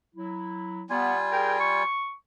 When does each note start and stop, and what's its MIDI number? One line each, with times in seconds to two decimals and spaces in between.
0.15 0.84 54
0.15 0.84 64
0.90 1.83 55
0.90 1.18 59
0.90 1.83 65
0.90 1.83 80
1.30 1.59 68
1.30 1.59 70
1.30 1.59 79
1.60 2.13 85